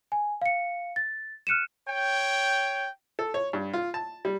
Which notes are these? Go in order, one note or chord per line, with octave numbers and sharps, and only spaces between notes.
G#5
F5 C#7
A6
F6 F#6 C#7 D#7 E7
C#5 G5
A4
C#5
G2
F4
A5
G3